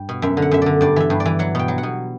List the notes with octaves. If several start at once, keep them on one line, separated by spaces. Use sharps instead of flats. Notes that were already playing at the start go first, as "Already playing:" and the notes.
Already playing: G2 G5
B2
F#2 E5
D3
F#5
F#2 E5
D3 D5
G2 D5
E3 E5
G2
D5
E3
F#3 F#5
B2 G5
F#3
F#5
B2